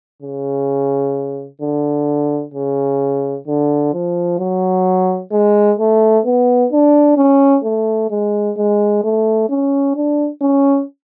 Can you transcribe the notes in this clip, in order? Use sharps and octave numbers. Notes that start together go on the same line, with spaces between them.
C#3
D3
C#3
D3
F3
F#3
G#3
A3
B3
D4
C#4
A3
G#3
G#3
A3
C#4
D4
C#4